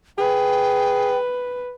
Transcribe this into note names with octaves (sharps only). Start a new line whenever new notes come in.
G#4 B4 G5